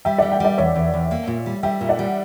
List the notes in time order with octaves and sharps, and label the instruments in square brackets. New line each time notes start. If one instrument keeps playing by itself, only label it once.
[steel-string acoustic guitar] G3 [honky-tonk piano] E5 G5
[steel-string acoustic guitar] G3 [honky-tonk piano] D5 F#5
[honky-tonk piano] E5 G5
[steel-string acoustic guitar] G3 [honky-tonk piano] D5 F#5
[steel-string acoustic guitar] E2 [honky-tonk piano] C#5 E5
[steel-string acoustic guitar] E2
E2
A#3
A#2
G3
[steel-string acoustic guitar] G3 [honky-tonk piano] E5 G5
[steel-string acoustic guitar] A#2
[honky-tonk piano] D5 F#5
[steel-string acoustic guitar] G3